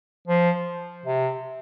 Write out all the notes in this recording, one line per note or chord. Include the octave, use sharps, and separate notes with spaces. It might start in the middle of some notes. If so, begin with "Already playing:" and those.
F3
C3